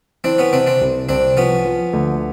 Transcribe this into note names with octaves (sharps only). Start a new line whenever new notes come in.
E3 C4 D4
B3 C#4
C3 C4 D4
C4 D4
C2
C2 C4 D4
F3 B3 C#4
F3
D2